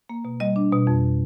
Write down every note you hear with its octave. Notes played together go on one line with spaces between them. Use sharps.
A#3
B2
G3 D#5
D4
B2
F2